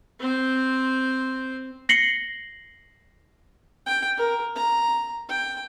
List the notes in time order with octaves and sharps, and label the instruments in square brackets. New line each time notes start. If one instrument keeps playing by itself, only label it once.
[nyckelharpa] C4 C5
[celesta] A#6 C7 C#7 F#7 G7
[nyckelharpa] G5
A#4
A#5
G5